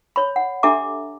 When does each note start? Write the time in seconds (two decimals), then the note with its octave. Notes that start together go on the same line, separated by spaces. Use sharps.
0.16 C#5 B5
0.36 F#5
0.63 D4 G4 A4 E5 A#5 D6